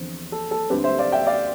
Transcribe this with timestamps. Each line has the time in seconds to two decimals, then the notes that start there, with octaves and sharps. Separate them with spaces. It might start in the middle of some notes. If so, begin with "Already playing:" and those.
Already playing: E2 D3 F3 C4
0.32 A4
0.51 A4
0.70 D2 D3 G3 C4 G4 B4
0.84 C5 E5
0.99 D5 F5
1.12 E5 G5
1.26 D5 F5